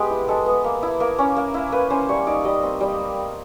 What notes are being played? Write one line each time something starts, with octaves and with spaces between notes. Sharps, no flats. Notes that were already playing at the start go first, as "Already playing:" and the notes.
Already playing: G#3 B3 G4
E4
G#3 A4
B3
A#3
E4
A#3 A#4
C#4
A#3
E4
A#3 B4
C#4 C5
G3 C#5
D#4 D5
G3 D#5
C4
G3